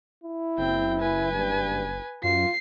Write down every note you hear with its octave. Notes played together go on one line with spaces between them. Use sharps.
E4
F#1 C4 G5
B4 G#5
G2
F#2 F4 C7